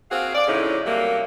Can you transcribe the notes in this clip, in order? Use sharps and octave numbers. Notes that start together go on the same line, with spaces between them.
A#3 C4 F#4 G#4 F5
D5
F2 A2 C#3 C#4 D#4 E4
C3 F#3 G3 A3 A#3